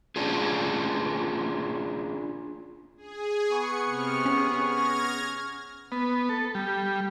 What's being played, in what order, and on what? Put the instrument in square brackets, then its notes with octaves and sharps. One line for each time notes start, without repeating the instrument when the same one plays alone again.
[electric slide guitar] C#4 D4 F4 G#4
[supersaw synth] G#4
[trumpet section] B3 C#6 [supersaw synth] C#7
[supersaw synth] C3 F6
[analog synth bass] C#4 [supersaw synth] G#4
[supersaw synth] F6 G#6 A#6
[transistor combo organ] B3
A4
G3